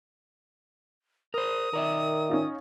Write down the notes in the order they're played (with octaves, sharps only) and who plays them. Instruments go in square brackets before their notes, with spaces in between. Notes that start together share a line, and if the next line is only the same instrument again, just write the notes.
[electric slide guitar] A#4 C5 [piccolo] D#6
[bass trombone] D#3 [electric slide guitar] A#4 D5 E5
[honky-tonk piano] C#4 D#4 F4